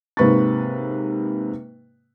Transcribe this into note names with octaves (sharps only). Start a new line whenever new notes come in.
G#2 C3 A#3 B4 C#6 A6